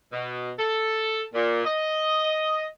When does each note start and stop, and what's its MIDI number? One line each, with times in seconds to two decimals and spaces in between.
0.12 0.50 47
0.58 1.23 69
1.33 1.61 46
1.65 2.65 75